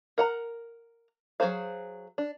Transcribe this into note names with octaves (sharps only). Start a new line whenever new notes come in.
A#4 F#5 A#5
F#3 F#4 G#4 C5 F5
D4